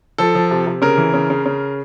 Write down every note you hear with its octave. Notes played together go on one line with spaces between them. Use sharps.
F3 A4
F3
C3
C3
C#3 A#4
E3
C#3
C#3
C#3